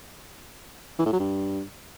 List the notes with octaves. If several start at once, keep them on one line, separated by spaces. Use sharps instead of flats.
E3
A2
F#3
G2